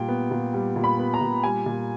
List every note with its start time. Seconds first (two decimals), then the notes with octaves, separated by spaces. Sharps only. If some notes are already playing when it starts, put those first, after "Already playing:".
Already playing: A#2 G3 G5
0.08 B3
0.31 A#2
0.54 G3
0.76 A#2
0.84 B5
0.99 B3
1.14 A#5
1.21 A#2
1.43 G3 G#5
1.66 A#2